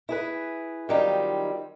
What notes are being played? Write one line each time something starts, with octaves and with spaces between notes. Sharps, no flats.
E4 G#4 B4
D#3 F#3 G3 C4 D#4 F4